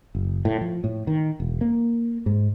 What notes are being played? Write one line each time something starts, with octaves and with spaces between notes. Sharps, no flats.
F#1
A2
F3
A2
D#3
E1
A#3
G#2